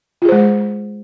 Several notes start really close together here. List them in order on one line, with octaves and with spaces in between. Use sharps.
F4 G#4 C5 G#3